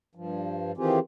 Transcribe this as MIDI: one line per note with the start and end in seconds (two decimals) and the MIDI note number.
0.15 0.72 43
0.15 0.72 53
0.77 0.99 51
0.77 0.99 52
0.77 0.99 60
0.77 0.99 65
0.77 0.99 67
0.77 0.99 68